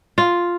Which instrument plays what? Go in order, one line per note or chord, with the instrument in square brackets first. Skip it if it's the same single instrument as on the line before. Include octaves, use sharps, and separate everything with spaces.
[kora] F4